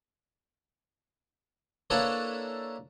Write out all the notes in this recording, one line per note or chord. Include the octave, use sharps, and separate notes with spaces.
A#3 D4 E4 A4 B4 C#5